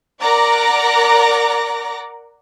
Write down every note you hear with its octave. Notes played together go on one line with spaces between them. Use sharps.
A#4 D5 F#5 A#5 D6 A#6